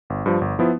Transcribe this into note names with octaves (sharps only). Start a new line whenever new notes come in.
G1
G2 F3
G1
F3 B3 E4